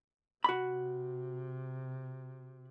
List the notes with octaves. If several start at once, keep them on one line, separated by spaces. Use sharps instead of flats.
C3 F#4 B5